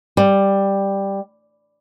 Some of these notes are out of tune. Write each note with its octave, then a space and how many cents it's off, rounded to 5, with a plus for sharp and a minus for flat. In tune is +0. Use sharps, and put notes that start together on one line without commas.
G3 +5